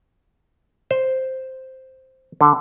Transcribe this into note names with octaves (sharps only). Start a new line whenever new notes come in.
C5
D3